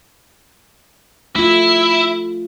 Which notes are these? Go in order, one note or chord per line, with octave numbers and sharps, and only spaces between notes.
A3 E4 F4